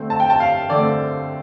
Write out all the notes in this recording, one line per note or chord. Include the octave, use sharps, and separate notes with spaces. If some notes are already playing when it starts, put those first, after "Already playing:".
Already playing: D3 A3 C4
A5
G5
A5
F5
D3 A3 C4 D5